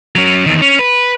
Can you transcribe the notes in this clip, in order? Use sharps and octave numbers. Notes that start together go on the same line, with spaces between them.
F#3 C#4
E2 D#3
C#4
B4